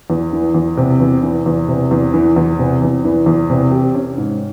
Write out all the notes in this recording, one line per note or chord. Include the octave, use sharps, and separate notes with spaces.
E2
E3
E2
C3
E2
E3
E2
C3
E2
E3
E2
C3
E2
E3
E2
C3
G4
C#4
G#2